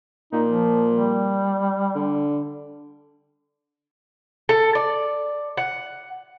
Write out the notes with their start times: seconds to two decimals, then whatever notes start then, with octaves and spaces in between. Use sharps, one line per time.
0.32 A#2 D#4
0.46 F3
0.91 G3
1.95 D3
4.49 A4
4.75 D5
5.57 F#5